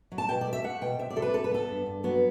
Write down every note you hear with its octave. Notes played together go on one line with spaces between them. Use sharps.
F#3
A5
B2 G5
D5
A3
E5
A3 F#5
B2 G5
C3 E5
D5
C3 A4
B4
G3 A4
B4
B3 A4
G2
G2
F#3 B3